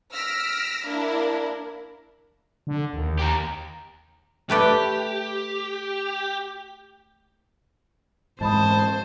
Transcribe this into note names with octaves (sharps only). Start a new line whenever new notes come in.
E6 F6 A#6 B6 D7
A#3 D4 E4 A#4
D3
D#2
G4 A#4
A3 G4 B4 D5
G#2 E3 C5 D#5 A5 B5 D#6